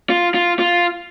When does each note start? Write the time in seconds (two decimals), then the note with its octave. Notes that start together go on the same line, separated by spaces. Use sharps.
0.10 F4
0.34 F4
0.59 F4